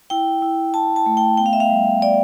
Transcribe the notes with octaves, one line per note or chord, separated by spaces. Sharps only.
E4 G5
E4
E4 A5
A5
A3
G5
B3 G5
F5
E5
F5
G3
B3 D5